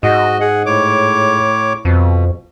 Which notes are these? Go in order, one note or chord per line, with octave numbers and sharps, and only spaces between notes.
G#2 F#4 D#5
G#4 F#5
A2 C#5 D6
F2 B2